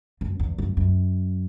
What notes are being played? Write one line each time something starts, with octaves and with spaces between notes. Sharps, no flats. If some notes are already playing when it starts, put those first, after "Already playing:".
F#2
E2
F#2
F#2